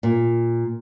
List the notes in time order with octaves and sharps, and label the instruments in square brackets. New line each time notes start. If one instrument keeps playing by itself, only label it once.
[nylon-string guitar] A#2